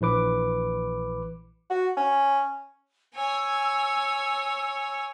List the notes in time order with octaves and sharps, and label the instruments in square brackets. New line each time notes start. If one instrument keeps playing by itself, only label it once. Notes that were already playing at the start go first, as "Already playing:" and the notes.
[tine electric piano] A#1 E3 B4 D6
[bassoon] F#4
C#4
[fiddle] C#5 G#5 [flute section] E6